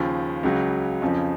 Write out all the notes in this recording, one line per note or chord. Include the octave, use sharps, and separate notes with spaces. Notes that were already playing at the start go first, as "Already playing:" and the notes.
Already playing: D#2 C#3 F3
C#2 C#3 F#3
F2 C#3 F3